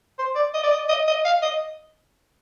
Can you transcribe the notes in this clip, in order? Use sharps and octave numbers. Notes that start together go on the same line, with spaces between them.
C5
D5
D#5
D5
D#5
D#5
D#5
F5
D#5